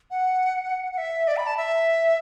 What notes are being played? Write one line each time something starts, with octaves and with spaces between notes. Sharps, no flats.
F#5
F#5
E5
D5
B5
A5
E5